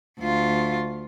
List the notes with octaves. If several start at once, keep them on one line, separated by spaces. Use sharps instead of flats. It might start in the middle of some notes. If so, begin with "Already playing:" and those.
D2 F4